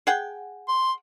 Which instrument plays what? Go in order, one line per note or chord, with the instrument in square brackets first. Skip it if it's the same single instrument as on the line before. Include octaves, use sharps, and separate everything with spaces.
[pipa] G#4 F#5 G5
[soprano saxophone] C6